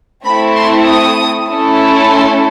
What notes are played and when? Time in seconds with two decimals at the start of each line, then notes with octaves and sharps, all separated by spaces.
0.24 A3 C4 E4 A4 B5
0.55 C6
0.86 D#6
1.49 A3 C#4 E4 A4
2.12 C6